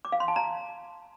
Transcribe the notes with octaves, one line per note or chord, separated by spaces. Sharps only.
D6
F5
C6
A5
A#5